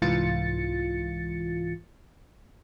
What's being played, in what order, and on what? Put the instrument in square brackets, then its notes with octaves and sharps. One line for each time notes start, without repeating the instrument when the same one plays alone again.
[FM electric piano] C2 G#2 E3 F4 A6 C#7